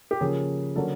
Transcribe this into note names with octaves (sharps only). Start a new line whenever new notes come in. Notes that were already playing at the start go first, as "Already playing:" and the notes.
G4
C#3 F3 A#3 C#4 G#4
D3 F#3 A#3 C#4 A4